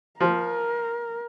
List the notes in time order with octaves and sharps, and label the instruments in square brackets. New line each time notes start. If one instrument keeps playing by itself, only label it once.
[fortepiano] F3 [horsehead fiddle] A#4